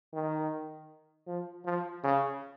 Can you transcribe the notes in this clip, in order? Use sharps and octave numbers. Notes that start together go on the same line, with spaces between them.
D#3
F3
F3
C#3